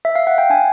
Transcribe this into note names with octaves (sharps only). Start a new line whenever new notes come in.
E5
F5
F#5
G5
D4 G#5